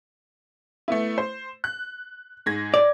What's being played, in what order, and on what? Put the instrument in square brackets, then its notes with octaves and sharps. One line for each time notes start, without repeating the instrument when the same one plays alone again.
[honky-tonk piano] A3 B3 E4
C5
F#6
G#2 G#6 A#6
[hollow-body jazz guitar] D5